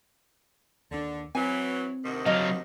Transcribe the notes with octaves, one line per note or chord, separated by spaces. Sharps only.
D#2 D3 D4
E3 F#3 C4 G#5
D2 C3 D#3
F#3 D#5 F5